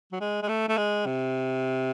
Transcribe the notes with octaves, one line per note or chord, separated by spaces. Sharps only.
F#3
G#3
G#3
A3
A3
G#3
C3